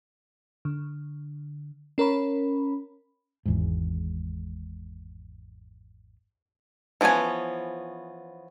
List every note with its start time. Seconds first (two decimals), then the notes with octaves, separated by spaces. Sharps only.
0.65 D3
1.98 C#4 A#4 C#5 B5
3.46 G#1 E2 G#2
7.01 E3 F3 B3 C#4 G#5